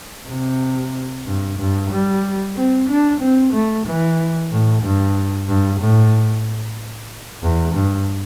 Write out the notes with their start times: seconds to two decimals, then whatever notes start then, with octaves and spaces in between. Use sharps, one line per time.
0.28 C3
1.26 G2
1.58 G2
1.90 G3
2.56 C4
2.89 D4
3.20 C4
3.53 A3
3.86 E3
4.51 A2
4.83 G2
5.48 G2
5.80 A2
7.42 E2
7.75 G2